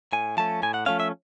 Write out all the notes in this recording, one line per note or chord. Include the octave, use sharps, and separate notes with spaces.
A2 G#5
F3 A3 C#4 A5
A2 G#5
F#5
F3 A3 C#4 F5
E5